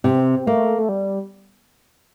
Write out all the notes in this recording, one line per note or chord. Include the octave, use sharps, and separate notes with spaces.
C3 C4
A3 A#3
A3
G3